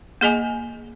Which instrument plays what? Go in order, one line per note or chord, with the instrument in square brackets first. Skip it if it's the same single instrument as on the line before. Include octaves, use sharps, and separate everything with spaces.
[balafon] A#3 G#4 D#5 G#5